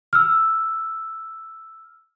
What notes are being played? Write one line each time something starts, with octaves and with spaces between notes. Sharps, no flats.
E6 F6